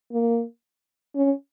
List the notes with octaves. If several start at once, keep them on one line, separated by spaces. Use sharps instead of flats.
A#3
C#4